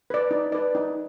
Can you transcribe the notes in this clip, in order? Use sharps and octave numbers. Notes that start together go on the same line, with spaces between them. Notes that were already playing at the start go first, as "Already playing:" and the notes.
B4 D5
D#4
B4 D5
D#4